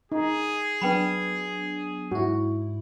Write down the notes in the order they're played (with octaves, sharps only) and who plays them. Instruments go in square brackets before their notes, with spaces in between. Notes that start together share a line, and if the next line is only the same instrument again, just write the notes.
[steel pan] D#4 [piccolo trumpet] G#4
[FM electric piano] F#3 B3 D4 [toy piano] B4 G5 B5
[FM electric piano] G#2 E4 [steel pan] F#4